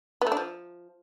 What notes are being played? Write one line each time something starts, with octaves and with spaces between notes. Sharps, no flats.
B3
A3
D4
F3